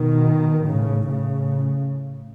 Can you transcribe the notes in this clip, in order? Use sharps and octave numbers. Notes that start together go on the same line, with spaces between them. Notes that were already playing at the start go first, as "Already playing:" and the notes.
Already playing: B2 D#3
A2 C#3
A2 C#3